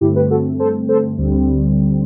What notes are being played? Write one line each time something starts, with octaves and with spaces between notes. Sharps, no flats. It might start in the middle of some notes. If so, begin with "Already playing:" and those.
G2 D3 A3 C4 E4 G4
G4 B4
F#4 A4
A4 C5
A4 C5
D2 D3 G3 C4